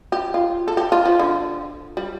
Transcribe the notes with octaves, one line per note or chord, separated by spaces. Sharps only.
G4
F4
A4
G4
F4
F3
D3
G3